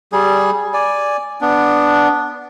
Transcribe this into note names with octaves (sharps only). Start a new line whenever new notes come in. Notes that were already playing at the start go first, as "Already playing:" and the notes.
G3 G#4
D5 G#5
B3 D4